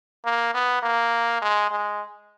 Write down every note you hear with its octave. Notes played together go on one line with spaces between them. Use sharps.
A#3
B3
A#3
G#3
G#3